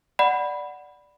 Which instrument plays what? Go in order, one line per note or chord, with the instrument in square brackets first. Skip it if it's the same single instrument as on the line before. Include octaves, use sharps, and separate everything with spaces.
[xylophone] D5 F#5 B5